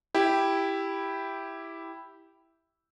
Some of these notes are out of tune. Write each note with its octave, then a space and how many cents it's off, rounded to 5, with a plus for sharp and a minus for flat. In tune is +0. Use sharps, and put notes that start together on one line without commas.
E4 +0 G4 +0